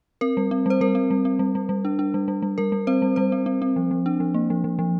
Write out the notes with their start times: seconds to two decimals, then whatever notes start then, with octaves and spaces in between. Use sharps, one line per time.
0.21 C4 A#4
0.37 G3
0.51 C4
0.66 G3 C5
0.81 G3 A#4
0.95 C4
1.11 G3
1.25 C4
1.39 G3
1.55 G3
1.69 G3
1.85 D4
1.99 D4
2.14 G3
2.28 G3
2.42 G3
2.58 G3 A#4
2.72 G3
2.87 C4 C5
3.02 G3
3.16 G3 C5
3.32 C4
3.46 C4
3.62 C4
3.76 F3
3.91 F3
4.06 D4
4.20 F3
4.34 A#3
4.50 F3
4.64 F3
4.79 F3